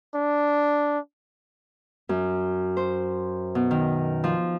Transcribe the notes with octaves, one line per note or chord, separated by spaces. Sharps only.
D4
F#2
C5
B2
D#3
F3